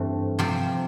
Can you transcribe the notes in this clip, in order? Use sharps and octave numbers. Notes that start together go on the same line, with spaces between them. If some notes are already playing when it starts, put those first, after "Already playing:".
Already playing: G2 E3 A3 C4
C3 F3 C4